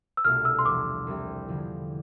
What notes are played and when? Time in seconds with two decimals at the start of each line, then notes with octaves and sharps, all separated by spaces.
0.17 E6
0.24 C2 B2 A3 D4 F4 F6
0.45 E6
0.59 C6
0.66 E2 C3 F3 D6
1.07 C2 C3 G3 C4 G4
1.48 E2 D3 F3